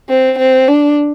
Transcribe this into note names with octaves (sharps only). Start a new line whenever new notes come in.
C4
C4
D4